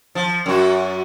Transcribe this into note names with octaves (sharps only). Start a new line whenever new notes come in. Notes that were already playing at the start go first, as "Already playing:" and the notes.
F3
F#2 F#4